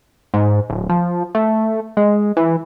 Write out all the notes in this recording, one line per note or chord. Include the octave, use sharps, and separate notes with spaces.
G#2
D1
F3
A3
G#3
E3